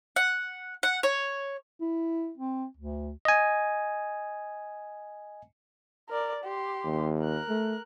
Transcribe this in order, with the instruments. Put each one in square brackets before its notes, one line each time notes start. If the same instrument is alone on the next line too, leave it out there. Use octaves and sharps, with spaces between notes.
[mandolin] F#5
F#5
C#5
[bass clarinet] E4
C4
D2
[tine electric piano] D#5 G#5
[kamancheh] A#4 D5
G4 C6
[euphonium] D#2
[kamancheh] A#4 F#6
[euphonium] A3